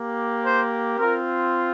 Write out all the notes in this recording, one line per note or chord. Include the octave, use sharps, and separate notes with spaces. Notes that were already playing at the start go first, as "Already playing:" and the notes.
Already playing: A#3 G4
C5
C4 F4 A#4